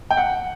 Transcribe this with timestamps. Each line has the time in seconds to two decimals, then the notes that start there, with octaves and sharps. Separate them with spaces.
0.11 G5
0.17 F#5